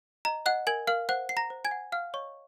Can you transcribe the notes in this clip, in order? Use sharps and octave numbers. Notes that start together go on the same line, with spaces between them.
D#5 A#5
D#5 F#5 F#6
A#4 G#5 G#6
A#4 F5 F6
C5 F#5 F#6
F#5 C7
A#5 A#6
C5
G#5 G#6
F#5
F5 F#5 F6
C#5 D#5 C#6